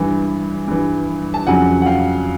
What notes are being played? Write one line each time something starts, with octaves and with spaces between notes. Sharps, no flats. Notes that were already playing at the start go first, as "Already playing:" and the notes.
Already playing: G2 E3
G2 E3
A5
F2 C#3 F#3 F#5 G#5
F#5
F5 G5